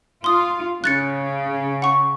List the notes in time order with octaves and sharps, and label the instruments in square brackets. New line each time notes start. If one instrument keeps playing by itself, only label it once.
[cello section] F4 [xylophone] C6 D#6
[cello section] C#3 [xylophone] F#6 A6 C#7
[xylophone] F#5 C#6